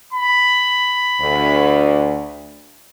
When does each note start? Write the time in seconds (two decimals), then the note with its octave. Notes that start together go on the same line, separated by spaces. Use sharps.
0.13 B5
1.21 D2